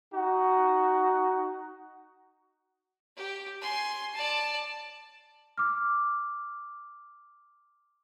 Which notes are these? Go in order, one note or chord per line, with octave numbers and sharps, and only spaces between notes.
D#4 F#4
G4
G#5 C6
D5 A5
D6 F6